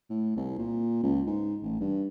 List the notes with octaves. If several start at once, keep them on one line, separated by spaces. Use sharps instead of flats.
A2
C2
A#2
C#2
G#2
A1
G2